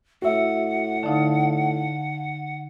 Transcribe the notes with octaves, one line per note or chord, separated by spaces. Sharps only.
A2 F#4 E5 F#5
D3 D#4 F5 A5